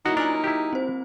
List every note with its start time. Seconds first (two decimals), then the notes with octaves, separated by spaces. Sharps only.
0.06 F#3 A#3 D#4 E4 F#4
0.17 D4 F4 A#4 F#5 G#5
0.44 E4 G4
0.73 C4 C5